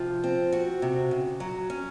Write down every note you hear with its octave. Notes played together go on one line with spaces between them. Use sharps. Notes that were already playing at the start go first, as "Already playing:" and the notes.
Already playing: C3 F3
C4
F#4
C3
C#3
F#3
C#4